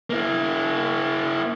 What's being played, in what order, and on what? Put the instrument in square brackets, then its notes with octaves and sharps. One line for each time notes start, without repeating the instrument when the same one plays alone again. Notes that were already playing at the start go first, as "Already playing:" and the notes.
[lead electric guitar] A#3 E4